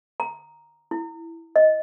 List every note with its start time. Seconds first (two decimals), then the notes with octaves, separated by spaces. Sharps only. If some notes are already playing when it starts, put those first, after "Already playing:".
0.20 A#5
0.91 E4
1.56 D#5